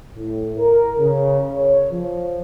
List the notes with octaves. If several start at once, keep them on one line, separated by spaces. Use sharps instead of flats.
A2
A#4
C#3
C#5
F3